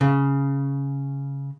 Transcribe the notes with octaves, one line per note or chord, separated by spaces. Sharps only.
C#3